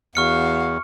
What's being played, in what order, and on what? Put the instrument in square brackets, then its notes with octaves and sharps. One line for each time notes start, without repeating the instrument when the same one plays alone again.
[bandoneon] E2 [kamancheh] F#4 F5 [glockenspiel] C#6 F6 C#7